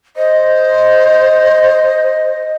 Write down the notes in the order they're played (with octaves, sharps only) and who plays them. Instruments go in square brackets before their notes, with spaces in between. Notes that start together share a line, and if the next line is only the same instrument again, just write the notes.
[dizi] C5 [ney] D#5